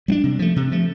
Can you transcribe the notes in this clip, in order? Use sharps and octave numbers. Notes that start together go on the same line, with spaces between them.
G3 B3 D4
C3
F3 A3
C3
F3 A3